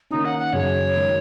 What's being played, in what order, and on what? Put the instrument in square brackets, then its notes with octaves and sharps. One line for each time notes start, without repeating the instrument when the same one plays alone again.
[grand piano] D#3 A#3 C#4 [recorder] D#4
[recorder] F#5
F#5
[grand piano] F#2 C#3 F#3 C#4 G#4 [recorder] C#5
[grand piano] D#3 G#3 D#4 F#4